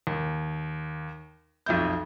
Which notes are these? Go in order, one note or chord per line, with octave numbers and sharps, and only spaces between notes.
D#2
B1 F2 E5 G6